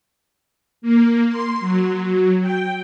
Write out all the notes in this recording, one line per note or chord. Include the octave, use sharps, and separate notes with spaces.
A#3
C6
F#3
G5